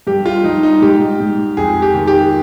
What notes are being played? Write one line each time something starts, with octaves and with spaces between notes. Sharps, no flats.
G2 G4
F4
G2 D#4
D#4
G#2 G4
G#2
F2 G#4
G4
D#3
G4